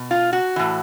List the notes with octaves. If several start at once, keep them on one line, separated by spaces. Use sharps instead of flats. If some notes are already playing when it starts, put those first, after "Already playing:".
Already playing: B2
F4
F#4
A2 E3